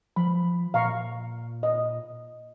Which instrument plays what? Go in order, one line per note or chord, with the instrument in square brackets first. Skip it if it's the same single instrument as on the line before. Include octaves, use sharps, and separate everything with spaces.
[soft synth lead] F3 [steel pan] B5
[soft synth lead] A#2 [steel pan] F5 A#5 C#6
[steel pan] D#5